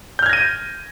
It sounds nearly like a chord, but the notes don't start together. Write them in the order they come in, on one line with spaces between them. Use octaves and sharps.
G6 F6 G#6 A#6 D#7